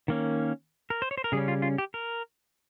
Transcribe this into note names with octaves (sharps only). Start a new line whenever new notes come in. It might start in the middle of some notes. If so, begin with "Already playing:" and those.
D#3 A#3 C#4
A#4
C5
C#5
C5
A#4
C#3 G3 C#4 G#4
F4
F4
G4
A#4